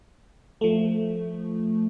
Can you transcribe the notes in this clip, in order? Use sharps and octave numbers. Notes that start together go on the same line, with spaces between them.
F3 A3